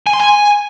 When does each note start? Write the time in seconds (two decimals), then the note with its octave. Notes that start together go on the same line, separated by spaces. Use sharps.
0.07 G#5
0.13 C6
0.20 G#5